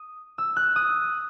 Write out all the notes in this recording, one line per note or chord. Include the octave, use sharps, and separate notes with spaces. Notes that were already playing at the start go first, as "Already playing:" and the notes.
Already playing: D#6
E6
F#6
D#6